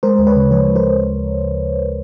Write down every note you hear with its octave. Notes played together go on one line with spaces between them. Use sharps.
G#3 A#4 C5
D2
B4 C#5
C#3
F3 B4 C#5
G#3
A#4 C5